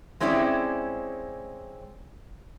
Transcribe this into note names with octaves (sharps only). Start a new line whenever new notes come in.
G#3 C4 C#4 E4 G4 D5